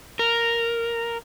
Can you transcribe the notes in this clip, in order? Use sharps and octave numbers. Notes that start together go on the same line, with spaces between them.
A#4